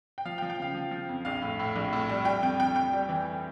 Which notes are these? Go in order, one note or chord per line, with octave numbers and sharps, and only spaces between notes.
G5
F3 F5
G5
F3
G5
C#3 F5
F3
F3
F2
A#1 F5
A2
A2
A#1
A2
G3
G3 G5
F2 G5
F2 G5
F2 G5
G3
E3